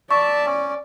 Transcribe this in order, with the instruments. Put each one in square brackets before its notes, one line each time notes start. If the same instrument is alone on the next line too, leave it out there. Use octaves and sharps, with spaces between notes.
[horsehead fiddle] D5 [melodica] E5 A5 [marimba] C#6
[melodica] C#4